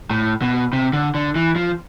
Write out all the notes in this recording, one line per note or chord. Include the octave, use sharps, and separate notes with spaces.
A2
B2
C3
D3
D3
E3
F3